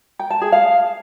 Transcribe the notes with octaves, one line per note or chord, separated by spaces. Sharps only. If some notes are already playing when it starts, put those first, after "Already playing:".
G5
A5
G#4
F5